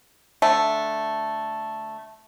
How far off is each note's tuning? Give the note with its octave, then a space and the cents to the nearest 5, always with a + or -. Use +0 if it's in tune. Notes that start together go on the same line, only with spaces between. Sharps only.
D3 +0 A3 +0 A5 +0